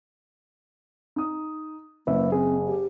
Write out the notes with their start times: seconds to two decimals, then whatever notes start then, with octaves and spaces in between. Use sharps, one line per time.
1.16 D#4 D#6
2.07 F#1 A#3 B4 E5
2.32 C4 G#4
2.68 G4